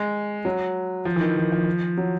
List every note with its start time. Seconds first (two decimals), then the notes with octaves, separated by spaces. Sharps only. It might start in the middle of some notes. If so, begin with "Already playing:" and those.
Already playing: G#3
0.45 F#3
1.05 F3
1.16 E3
1.21 D#3
1.37 E3
1.52 F3
1.97 F#3